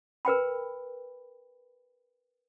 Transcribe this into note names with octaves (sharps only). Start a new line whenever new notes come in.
A#4 B4 G5 B5